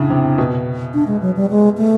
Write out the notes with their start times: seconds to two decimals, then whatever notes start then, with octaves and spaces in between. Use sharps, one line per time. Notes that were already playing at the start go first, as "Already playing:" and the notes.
Already playing: A2 C#3 D4
0.10 C3
0.38 B2
0.94 D4
1.07 G#3
1.21 F#3
1.36 G3
1.50 G#3
1.78 A3